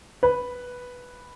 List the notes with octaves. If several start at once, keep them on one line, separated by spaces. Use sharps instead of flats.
B4